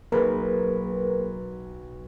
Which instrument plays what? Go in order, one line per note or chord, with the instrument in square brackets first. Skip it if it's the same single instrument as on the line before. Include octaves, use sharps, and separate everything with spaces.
[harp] B1 [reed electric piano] A#3 G#4 [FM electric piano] A#4 B4